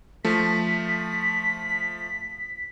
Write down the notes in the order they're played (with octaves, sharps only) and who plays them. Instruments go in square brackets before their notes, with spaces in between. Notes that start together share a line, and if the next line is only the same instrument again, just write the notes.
[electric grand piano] F3 A3 [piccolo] B6